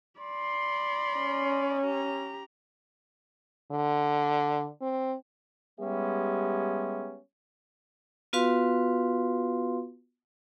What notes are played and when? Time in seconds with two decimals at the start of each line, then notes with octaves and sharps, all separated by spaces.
0.21 D5 B5 C6
1.18 C#4
1.85 G4 A#5
3.72 D3
4.81 C4
5.80 G3 G#3 B3 C#4 G4 E5
8.33 B3 F4 F#4 B4 F5 C6